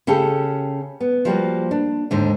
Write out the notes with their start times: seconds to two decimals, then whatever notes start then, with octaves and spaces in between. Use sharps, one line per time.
0.07 C#3 C#4 G4 A4
1.00 B3
1.25 F3 G3 A#3 F#4
1.71 D4
2.11 D#2 G#2 D3